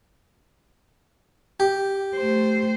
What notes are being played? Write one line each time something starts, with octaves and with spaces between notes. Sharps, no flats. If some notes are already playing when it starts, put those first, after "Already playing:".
G4
A3 C5